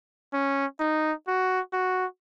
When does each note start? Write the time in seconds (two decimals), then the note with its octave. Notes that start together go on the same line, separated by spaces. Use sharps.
0.34 C#4
0.80 D#4
1.28 F#4
1.73 F#4